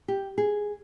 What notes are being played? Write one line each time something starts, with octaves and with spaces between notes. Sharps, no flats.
G4
G#4